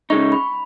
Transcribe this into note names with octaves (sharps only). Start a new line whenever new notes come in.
C#2 C#3 G#3 D#4 C#6
B5